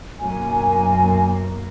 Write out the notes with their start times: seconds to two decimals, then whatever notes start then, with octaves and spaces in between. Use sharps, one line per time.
0.20 B1 F#2 A#3 G#5